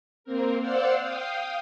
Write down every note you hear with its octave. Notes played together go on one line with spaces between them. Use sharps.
A#3 C4 A#4
C5 D5 F5 F#5 E6
F5 G5 D#6